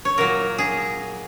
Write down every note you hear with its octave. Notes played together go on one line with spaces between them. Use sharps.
C#5
A#2 F#3 A#4
G#4